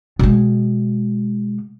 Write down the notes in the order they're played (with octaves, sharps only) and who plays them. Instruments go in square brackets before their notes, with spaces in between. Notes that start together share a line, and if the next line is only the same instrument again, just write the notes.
[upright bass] B2 G#3